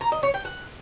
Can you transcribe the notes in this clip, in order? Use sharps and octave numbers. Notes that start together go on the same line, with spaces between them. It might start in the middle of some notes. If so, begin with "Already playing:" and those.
A#5
D#5
C#5
G5
F#5